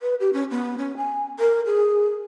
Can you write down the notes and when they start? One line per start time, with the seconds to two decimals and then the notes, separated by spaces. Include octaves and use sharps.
0.01 B4
0.20 G4
0.33 C#4
0.51 B3
0.78 C#4
0.97 G#5
1.39 A#4
1.66 G#4